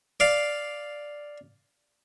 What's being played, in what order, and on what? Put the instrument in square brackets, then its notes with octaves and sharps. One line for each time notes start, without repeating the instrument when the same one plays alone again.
[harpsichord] D5 F5